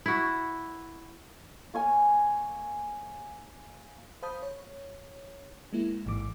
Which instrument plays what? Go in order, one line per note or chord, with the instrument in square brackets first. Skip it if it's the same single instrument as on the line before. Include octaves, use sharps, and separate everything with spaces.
[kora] E4 F#4
[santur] A#3 C#5 G#5
[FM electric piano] C5 F5 A5 B5 D#6 G6
C#5
G#3 A#3 E4
A1 G#2 E3 D6